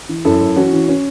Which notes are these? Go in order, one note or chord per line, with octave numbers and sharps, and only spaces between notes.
E3
F#2 E4 A4
F#2
E3 C#4 F#4
E3
C#4